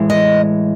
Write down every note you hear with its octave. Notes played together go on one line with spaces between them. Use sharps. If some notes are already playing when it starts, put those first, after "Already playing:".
Already playing: A2 E3 G#3
D#5